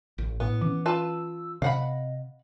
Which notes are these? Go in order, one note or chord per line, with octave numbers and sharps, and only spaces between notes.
A1
A2 B3
E3 C#4 D6
F4 B4 A5 E6
C3 D#5 F5 F#5 B5